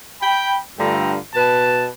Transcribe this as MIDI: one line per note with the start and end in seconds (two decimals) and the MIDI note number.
0.21 0.57 79
0.21 0.57 83
0.78 1.16 43
0.78 1.16 50
0.78 1.16 57
0.78 1.16 65
0.78 1.16 79
0.78 1.16 82
1.34 1.87 47
1.34 1.87 71
1.34 1.87 81